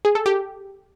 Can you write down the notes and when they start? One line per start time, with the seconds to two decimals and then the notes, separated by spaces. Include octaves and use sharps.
0.05 G#4
0.15 A4
0.26 G4